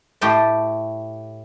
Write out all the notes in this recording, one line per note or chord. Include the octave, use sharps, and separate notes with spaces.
A2 A3 G4 G5 A5